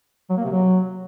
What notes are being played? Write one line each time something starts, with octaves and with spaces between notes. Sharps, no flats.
F#3
A#3
C3
F#3